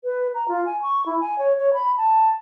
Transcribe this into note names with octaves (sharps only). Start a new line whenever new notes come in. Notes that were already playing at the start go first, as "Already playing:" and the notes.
B4
A#5
F4
G#5
C#6
E4
G#5
C#5
C#5
B5
A5